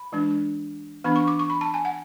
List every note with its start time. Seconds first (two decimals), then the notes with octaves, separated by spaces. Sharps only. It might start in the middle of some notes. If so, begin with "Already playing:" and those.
Already playing: B5
0.12 E3 G#3 D4
1.04 E3 B3 D4 B5
1.16 C#6
1.27 D6
1.39 C#6
1.50 B5
1.61 A5
1.74 G#5
1.85 F#5